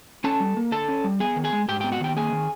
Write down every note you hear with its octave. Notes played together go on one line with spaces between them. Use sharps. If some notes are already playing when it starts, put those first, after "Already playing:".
C#4 A4 A5
G3
A#3
D3 A4 A5
C#4
G3
B3 G#4 G#5
D#3
G#4 G#5
G#3
G#2 G4 G5
G4 G5
B3
F#4 F#5
D#3 G4 G5
A#3 G#4 G#5
D#3